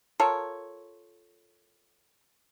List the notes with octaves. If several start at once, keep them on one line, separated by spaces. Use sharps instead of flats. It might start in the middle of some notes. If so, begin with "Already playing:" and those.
F4 A4 A#4 C#5